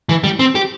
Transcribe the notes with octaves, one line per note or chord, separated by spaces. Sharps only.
E3
G3
C4
G4